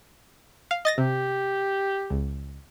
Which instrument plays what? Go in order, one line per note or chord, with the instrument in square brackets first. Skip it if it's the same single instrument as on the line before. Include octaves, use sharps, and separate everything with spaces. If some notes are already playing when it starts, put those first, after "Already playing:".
[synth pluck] F5
D#5 A6 A#6
[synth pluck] C3 [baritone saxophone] G4
[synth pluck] C#2